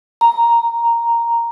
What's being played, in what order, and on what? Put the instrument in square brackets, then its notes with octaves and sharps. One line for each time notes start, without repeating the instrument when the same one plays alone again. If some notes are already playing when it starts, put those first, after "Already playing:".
[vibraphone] A#5